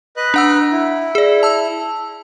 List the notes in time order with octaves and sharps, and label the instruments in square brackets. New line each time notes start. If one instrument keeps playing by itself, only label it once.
[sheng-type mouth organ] B4 D#5 F#6
[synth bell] D4 F#5 E6
[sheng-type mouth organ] E4
[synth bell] G#4 D5
A5 E6